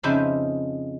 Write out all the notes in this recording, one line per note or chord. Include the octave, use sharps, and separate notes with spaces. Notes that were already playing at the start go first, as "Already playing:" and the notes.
F2 C#3 D#4 C5 E5 B5